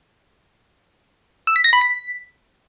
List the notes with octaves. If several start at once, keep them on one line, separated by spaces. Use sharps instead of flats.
E6
B6
A#6
B5
B6